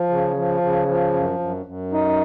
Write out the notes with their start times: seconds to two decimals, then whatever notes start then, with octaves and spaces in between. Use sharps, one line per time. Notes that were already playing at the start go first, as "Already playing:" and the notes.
Already playing: F3
0.09 C#3
0.36 F3
0.61 C#3
0.88 F3
1.13 F#2
1.39 F#2
1.66 F#2
1.92 D#4